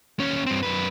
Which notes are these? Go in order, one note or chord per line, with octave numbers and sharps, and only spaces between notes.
D#2 C#4
G2 C4
F#2 B4